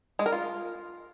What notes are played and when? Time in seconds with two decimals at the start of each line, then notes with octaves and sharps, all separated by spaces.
0.19 G#3
0.26 A#4
0.32 F4